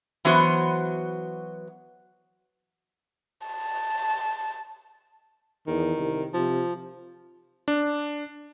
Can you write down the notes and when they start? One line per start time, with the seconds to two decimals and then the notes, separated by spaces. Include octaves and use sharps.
0.25 E3 F#3 B3 F#4 C5
3.47 A5
5.67 E2 D#3
5.97 C2
6.34 C3 F3
7.68 D4